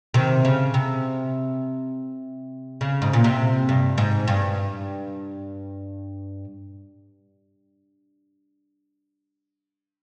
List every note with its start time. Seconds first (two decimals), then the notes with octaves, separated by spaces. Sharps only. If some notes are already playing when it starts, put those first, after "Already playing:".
0.14 C3 D#3
0.45 C#3
0.74 C3
2.81 C#3
3.02 G#2
3.13 A#2
3.24 C3
3.69 G2
3.98 G#2
4.28 G2